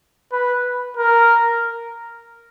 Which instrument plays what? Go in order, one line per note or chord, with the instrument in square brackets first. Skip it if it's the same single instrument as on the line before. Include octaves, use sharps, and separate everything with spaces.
[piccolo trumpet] B4
A#4